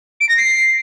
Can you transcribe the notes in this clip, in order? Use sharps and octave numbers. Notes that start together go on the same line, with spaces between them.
D7
A#6
C7